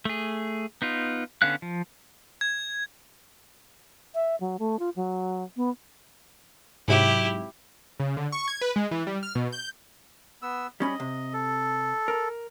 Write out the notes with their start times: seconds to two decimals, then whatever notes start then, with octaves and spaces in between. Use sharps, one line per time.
0.05 A3 G#4
0.82 B3 D#4 F4
1.42 D3 B3 C#4 F5 F#6
1.62 F3
2.41 G#6
4.15 E5
4.40 F#3
4.59 A3
4.79 F4
4.96 F#3
5.57 B3
6.88 G#2 C3 F#3 E4 G4
8.00 C#3
8.17 D3
8.32 C#6
8.48 G#6
8.61 B4
8.76 G#3
8.91 E3
9.07 G3
9.23 F6
9.35 B2
9.52 G6
10.42 B3 E6
10.80 G3 C#4 D#5 B5
11.00 C3
11.33 A4
12.08 A#4